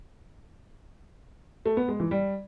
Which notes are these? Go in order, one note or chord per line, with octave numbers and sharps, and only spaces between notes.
A3
B3
G#3
E3
G3